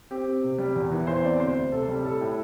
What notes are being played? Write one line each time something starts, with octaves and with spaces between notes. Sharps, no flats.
C4 G4
C4
C3
G3
E2
E3
E2 C5
C4 D5
D2 C5
D2
C3 A4
G3
A2 A4
A2